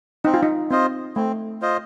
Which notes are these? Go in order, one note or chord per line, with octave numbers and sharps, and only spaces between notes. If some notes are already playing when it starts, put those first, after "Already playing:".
C4 D#4
F4
D#4
C4 F4 C5 D#5
A3 C4
F4 C5 D#5